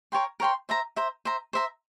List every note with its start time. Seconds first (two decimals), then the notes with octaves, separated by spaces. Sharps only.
0.12 A#4 C#5 G5 C6
0.40 A#4 C#5 G5 C6
0.69 C5 E5 A#5
0.96 C5 E5 A#5
1.25 C5 E5 A#5
1.53 C5 E5 A#5